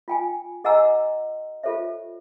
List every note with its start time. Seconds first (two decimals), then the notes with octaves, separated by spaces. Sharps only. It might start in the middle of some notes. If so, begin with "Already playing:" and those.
0.08 F4 G5 G#5
0.64 G#4 D#5 F#5 G#5 A#5 E6
1.63 F4 G4 A4 C5 C#5 E5